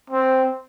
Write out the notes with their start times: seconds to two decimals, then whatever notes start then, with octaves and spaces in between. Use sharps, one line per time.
0.10 C4